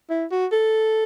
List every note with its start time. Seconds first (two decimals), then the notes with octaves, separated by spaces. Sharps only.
0.10 E4
0.31 F#4
0.52 A4